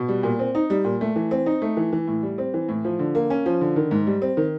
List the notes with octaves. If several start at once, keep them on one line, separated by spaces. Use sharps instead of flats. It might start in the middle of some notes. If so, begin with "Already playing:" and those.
Already playing: B2
G3
A#2
C4
D#4
G3
A#2
A3
E3
C4
D#4
A3
E3
E3
A2
G3
C4
E3
A2
F3
D3
A#3
C#4
F3
D3
D#3
G#2
G3
C4
D#3